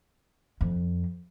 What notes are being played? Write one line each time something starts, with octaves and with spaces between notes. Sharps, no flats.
F2